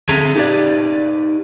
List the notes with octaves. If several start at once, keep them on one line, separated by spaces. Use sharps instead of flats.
D3 C4 G#4 A4 E5 A#5
D#4 G4 G#4 B4 D5